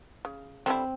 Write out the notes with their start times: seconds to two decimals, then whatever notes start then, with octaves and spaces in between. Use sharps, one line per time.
0.25 C#3
0.66 D3 G3 C4 E4